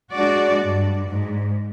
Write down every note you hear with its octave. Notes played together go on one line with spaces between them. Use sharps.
G#3 D4 F#4 D5
G2
G#2